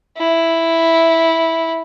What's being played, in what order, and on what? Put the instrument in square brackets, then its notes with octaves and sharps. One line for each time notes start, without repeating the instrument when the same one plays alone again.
[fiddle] E4